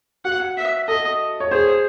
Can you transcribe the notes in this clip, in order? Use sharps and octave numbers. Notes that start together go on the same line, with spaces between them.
F#4 F#5
E5
A4 D#5
C#5
G#4 C5